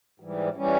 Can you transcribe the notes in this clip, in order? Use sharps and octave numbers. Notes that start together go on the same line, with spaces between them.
G#2 E3 G3
E3 G3 C#4